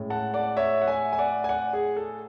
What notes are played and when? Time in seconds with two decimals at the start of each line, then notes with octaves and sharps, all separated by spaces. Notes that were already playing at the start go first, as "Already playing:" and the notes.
Already playing: A2 G#3 C#4
0.10 F#5 A5
0.34 D5 F#5
0.57 C#5 E5
0.82 F#5
0.88 E5 G#5
1.13 G#5
1.18 D5 F#5
1.44 G#5
1.49 D5 F#5
1.73 G#4
1.97 A4